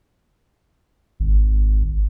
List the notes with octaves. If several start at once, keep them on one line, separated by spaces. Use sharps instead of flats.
G#1